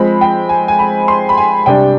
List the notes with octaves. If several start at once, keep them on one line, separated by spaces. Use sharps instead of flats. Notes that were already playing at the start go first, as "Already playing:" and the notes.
Already playing: F3 G#3 C4 B5
G5
G#5
G#5
B5
C6
B5
G#5
C3 G3 D4 G5